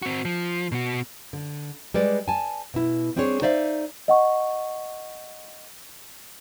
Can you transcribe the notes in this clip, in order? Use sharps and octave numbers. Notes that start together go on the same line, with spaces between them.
C4 F#4
F3
B2 F#4
D3
G3 G#3 B4 D5
G#5 A5
B2 E4
G3 C4 D4 E4 G#4 C#5
D#4 C5 D5 E5 F5
D#5 F#5 C#6